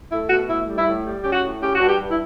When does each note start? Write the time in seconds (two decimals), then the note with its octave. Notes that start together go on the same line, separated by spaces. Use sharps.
0.11 A3 E4
0.30 B2 F#4
0.49 A2 E4
0.67 G3
0.77 E4
0.86 A2
1.05 G3
1.22 C#4 G4
1.33 F#4
1.42 A2
1.61 C#4 G4
1.74 F#4
1.79 G2
1.88 G4
1.99 G2
2.09 E4